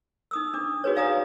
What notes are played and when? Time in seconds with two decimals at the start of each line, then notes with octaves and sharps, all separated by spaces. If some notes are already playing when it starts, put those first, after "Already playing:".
0.31 D#4 D#6 E6
0.54 D4 D6
0.84 D#4 F#4 G#4 B4 C#5
0.95 D#4 D5 F5 G#5 A#5 D#6